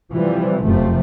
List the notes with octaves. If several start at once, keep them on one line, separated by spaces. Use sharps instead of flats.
C3 E3 F3 G3
F1 F#2 C3 F3 A3